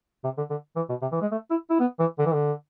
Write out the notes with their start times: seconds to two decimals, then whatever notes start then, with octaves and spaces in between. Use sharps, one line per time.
0.24 C3
0.37 D3
0.50 D3
0.76 E3
0.89 B2
1.02 C3
1.12 E3
1.21 G#3
1.31 A3
1.50 E4
1.70 E4
1.80 B3
1.99 E3
2.18 D3
2.26 E3
2.33 D3